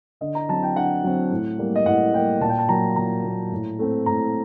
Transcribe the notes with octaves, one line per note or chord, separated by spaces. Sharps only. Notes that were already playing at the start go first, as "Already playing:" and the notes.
D3 D#5
A#5
F#3 C4 A5
G5
D3 F#5
F#3 C4
A2
G3 A#3
D#5
A2 F#5
G3 A#3 G5
A#2 A5
G5
A5
F#3 A#3 A#5
A#2 A#5
F#3 A#3
A2
A3 C4
A2 A#5